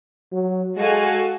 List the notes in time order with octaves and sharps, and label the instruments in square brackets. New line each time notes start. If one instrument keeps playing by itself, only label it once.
[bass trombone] F#3
[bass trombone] G#3 [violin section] F#4 A4 F5 G#5